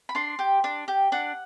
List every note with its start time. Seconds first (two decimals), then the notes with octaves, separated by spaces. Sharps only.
0.09 B5
0.15 D4 C6
0.39 G4
0.64 D4
0.88 G4
1.12 D4 F#5